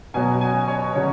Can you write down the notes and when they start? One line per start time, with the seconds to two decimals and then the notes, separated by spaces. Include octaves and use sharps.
0.14 B2 F#3 G#5
0.41 G#5
0.68 C#5
0.95 C#3 F#3 C#5